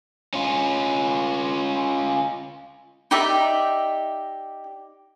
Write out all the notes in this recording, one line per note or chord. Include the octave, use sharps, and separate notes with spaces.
C#4 F4
D#4 G4 D5 E5